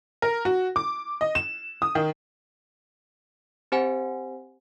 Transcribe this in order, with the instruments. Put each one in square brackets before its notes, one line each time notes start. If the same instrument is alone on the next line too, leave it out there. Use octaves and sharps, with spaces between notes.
[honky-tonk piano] A#4
F#4
D6
D#5
E7
D#6
D#3
[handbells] C4 G4 C5 F#5 G#5